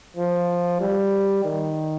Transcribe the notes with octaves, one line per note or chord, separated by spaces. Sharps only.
F3
G3
D#3